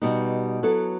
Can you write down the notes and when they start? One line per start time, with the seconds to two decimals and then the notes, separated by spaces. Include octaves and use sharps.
0.02 B2 G3 B3 D#4
0.63 F#3 B3 E4 A4